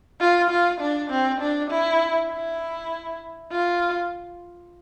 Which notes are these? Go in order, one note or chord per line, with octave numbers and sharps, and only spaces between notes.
F4
F4
D4
C4
D4
E4
E4
F4